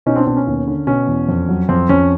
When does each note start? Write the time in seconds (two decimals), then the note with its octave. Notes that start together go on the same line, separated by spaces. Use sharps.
0.06 B2 C#4 D#4
0.16 C4 D4
0.27 B2 C4 D4
0.37 C#4
0.47 D#2
0.67 D3
0.87 B2 C#4
1.07 E2
1.29 F2
1.49 F#3
1.69 F2 C4
1.89 F2 C#4